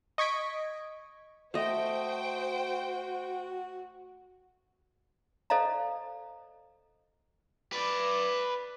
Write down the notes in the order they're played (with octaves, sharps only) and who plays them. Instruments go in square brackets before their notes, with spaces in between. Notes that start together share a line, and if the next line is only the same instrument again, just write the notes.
[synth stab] D#5 C#6 G#6 B6 D7
[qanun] A3 D#5 [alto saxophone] F#4 [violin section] C5 G5
[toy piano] A4 C5 D5 D#5 F5 A#5
[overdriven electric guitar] B4 D5